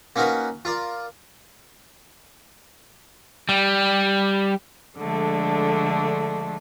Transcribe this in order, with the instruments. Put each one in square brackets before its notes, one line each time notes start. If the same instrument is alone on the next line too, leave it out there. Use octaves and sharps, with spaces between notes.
[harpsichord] A#3 C#4 D#4 F#4 A#4 B4
F4 A#4 D5
[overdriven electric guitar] G3
[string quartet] D3 F3 G#3 A3 D4